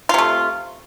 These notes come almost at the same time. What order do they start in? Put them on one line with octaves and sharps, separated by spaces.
F4 C3 A3